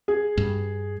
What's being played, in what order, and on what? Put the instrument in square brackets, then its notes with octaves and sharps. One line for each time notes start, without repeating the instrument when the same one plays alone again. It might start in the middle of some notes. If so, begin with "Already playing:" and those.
[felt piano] G#4
[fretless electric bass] G2